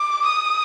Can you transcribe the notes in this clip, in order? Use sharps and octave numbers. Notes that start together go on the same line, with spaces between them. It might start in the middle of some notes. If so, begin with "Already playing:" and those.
Already playing: D6
D#6